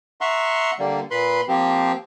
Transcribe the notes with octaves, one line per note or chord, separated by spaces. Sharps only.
E5 F#5 A#5 C6 C#6
D3 G3 A#3
A#2 B4 B5 C6
F3 A#3 C4 G4